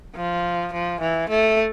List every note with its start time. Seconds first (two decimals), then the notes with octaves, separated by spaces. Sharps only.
0.16 F3
0.73 F3
1.01 E3
1.30 A3